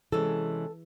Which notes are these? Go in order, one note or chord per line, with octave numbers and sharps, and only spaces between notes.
C3 E3 G#3 C#4 A4